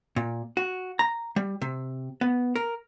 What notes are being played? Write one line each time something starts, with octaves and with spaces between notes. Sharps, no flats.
A#2
F#4
A#5
G3
C3
B3
A#4